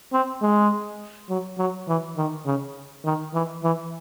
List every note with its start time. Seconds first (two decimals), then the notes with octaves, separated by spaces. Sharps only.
0.13 C4
0.42 G#3
1.29 F#3
1.58 F#3
1.88 E3
2.17 D#3
2.46 C#3
3.04 D#3
3.34 E3
3.63 E3